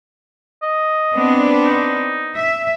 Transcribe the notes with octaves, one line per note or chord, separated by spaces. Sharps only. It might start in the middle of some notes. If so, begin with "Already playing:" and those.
D#5
B3 C4 D4
D#4
E5